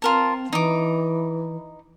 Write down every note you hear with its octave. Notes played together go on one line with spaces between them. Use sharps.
C4 F4 A#4 A5
E3 D#4 D6